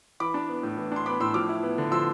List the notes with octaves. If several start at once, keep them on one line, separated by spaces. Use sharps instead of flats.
E3 B5 D6
D4
B3
A2
E3
D4 C6
B3 B5 D6
A2 C6 E6
F3 D6 F6
E4
B3
D3
F3 C6 E6